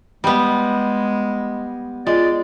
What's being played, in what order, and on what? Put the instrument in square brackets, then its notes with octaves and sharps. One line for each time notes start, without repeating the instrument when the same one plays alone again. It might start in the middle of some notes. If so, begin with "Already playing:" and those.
[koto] G3 B3 [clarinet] G#3
[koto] G#3 [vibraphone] F4 [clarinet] D5